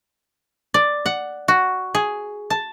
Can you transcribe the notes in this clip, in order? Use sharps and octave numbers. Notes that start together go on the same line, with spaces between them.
D5
F#5
F#4
G#4
A5